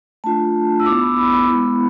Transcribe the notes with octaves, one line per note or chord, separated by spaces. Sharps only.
A3 D4 F4 A5
E6
B3 E4 D6
B5
B5
B5
G#3 B3 E4 B5